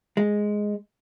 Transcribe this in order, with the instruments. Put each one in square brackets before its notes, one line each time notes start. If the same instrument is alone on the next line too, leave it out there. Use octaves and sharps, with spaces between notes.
[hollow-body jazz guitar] G#3